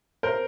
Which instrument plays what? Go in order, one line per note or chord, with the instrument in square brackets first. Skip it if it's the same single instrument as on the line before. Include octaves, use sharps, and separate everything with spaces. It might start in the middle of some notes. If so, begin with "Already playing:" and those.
[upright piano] A#4 C5